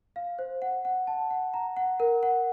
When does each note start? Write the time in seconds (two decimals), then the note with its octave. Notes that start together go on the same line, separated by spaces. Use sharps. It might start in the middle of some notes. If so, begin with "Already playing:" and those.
0.16 F5
0.39 C5
0.62 F#5
0.85 F#5
1.07 A5
1.30 F#5
1.54 A#5
1.77 F#5
2.00 A#4
2.23 F#5